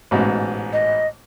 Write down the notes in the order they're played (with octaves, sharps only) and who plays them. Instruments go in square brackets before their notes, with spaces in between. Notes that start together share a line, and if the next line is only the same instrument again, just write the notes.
[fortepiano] A1 G#2 B2
[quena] D#5